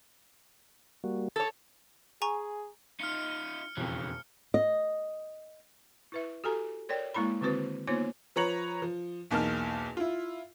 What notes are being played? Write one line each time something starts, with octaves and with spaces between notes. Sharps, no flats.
G3 A#3 F#4
A4 C#5 A6
G#4 G#5 A#5 C#6
D#4 F4 F6 C#7
E1 F2 C#3 E3
D#5
E4 B4 E5
F#4 G4 A4 G#5 A#5
A#4 C#5 D5 G5
G#3 A#3 E4 A#5 B5
D3 D#3 C4 F#4 B4 C5
A#3 B3 D#4 F4 C5 C#5
F3 B4 C#5 A#5 C#7 F#7
F3
B1 E2 A#3 D#4 A5 F6
E4 F4